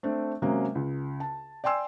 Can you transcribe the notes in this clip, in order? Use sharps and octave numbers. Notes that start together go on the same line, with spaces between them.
A3 C4 D4
C3 F#3 G#3 A#3 C#4
C#2
A5
D5 G5 G#5 C6 E6